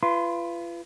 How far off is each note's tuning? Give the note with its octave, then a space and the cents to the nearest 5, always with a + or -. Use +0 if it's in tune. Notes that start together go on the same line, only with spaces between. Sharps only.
F4 -35 B4 +10 C6 +0